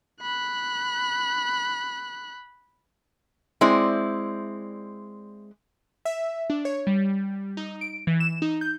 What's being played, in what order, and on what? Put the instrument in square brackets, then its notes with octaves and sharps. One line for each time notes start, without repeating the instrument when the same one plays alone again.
[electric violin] B5 F#6
[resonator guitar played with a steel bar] G#3 C4 E4 D5
[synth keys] E5
D4
C#5
G3
D#4
D7
E3
E7
D#4
G6